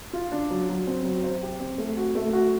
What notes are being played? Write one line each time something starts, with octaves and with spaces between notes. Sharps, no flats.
F4
D4
F#3
F#3
C4
F#3
C5
G4
C4
A3
F#4
A3
F#4